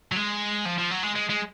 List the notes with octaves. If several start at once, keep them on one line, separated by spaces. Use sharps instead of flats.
F#3
G#3
F3
F3
F#3
G#3
G#3
G#3